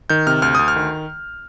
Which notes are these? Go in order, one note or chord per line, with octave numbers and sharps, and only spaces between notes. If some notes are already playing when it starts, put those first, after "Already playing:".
D#3 G6
C3 F6
D2 F6
D2 D#6
F6
D#3